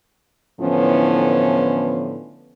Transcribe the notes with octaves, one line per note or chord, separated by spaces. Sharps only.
A2 D3 E3 F3 B3 C#4